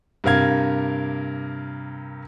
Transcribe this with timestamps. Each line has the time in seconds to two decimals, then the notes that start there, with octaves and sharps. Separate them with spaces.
0.24 G2 C3 A#4 F5 G#6